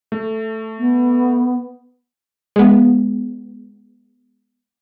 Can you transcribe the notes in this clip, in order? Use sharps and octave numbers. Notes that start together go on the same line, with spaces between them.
A3
B3
G#3 B3